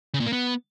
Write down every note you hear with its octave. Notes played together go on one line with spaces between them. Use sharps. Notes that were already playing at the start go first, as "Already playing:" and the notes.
C#3
A#2
A#3
B3